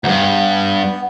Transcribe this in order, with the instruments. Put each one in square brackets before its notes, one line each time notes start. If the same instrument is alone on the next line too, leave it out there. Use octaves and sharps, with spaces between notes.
[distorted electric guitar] D2 G2 [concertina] B3